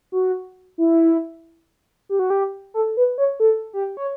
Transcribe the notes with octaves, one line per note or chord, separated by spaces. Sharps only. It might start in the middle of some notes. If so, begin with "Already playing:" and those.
F#4
E4
G4
F#4
G4
A4
B4
C#5
A4
G4
C#5